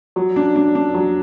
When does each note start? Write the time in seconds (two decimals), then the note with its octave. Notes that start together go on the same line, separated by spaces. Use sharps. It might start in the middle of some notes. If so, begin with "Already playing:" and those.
0.16 F#3
0.36 D4
0.55 D4
0.75 D4
0.94 F#3